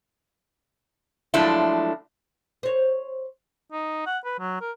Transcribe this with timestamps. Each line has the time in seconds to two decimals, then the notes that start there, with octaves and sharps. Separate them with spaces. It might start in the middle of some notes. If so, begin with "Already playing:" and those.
1.34 F3 F#3 G#3 A3 D4 E4
2.63 C5 C#5
3.72 D#4
4.07 F#5
4.25 B4
4.39 F#3
4.61 A#4